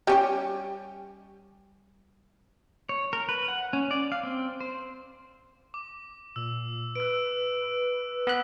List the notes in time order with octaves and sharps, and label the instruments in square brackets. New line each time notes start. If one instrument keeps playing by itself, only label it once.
[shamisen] G3 C#4 G4
[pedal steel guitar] C#5
A#4
B4
F#5
C#4
D5
F5
C4
C5
[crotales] D6
[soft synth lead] A#2 [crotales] E6
[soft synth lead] B4 [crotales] E6 D7
[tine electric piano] B3 F#6 [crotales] E6 B6